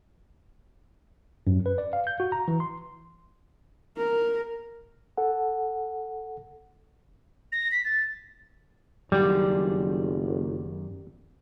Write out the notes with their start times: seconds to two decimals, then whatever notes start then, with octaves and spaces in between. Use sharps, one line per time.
1.47 F#2
1.66 B4
1.78 D5
1.93 F5
2.07 G6
2.20 F#4
2.32 A#5
2.48 E3
2.60 C6
3.98 A#4
5.17 A4 F#5
7.52 A#6
7.72 B6
7.85 A6
9.12 F#1 F#2 D#3 G3 D5